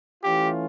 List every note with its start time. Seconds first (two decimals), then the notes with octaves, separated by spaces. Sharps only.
0.24 E3 A3 C#4 F4 G4